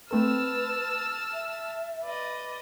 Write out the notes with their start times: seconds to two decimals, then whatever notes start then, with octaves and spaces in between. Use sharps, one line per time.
0.11 A3 C4 A4 B4 A5 E6 F6
1.33 E5
2.04 B4 D5 D#5